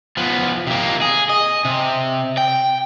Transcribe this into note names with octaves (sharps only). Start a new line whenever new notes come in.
F3 B3
C3 A#3
G#4
D#5
C3
G5